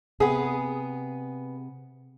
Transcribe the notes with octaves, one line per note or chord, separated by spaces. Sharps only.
C3 B3 G#4